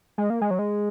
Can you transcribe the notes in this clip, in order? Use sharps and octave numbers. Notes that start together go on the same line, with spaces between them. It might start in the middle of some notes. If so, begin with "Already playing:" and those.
G#3
A#3
G#3
F#3
G#3